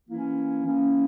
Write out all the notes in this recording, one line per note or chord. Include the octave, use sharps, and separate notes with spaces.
E3 A#3 C#4 E4
E3 A#3 C#4 E4